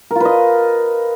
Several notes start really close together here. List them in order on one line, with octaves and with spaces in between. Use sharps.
A#4 F4 B4 D#5